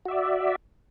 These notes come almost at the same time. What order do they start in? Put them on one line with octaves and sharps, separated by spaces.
F#4 E5 D5